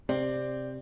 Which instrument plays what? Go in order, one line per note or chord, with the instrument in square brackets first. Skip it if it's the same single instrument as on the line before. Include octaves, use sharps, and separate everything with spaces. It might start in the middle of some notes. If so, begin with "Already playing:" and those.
[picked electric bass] C3 [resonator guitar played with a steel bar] C4 [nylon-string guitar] D5